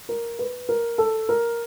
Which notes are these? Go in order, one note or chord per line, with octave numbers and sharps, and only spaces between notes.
A#4
B4
A#4
A4
A#4